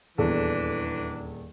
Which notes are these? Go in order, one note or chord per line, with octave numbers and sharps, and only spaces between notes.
D#1 E2 E3 D4 A4